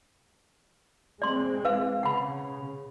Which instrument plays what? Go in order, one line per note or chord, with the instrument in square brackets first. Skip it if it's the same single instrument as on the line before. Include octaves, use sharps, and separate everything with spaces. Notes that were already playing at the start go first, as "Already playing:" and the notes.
[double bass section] G#3 C4 [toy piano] D5 C6
[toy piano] B4 F5
[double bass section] C#3 [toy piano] F#5 B5